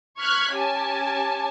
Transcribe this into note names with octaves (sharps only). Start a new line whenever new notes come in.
C#6 F6 F#6 G#6 B6
C#4 G4 G#5 A5